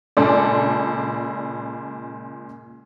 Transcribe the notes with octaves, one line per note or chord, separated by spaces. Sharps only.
C#2 A#2 D4 A4 D5 C6